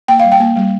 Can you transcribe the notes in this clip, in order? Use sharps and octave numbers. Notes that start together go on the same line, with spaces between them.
A#3 G5
G3 F5
G5
A#3
G3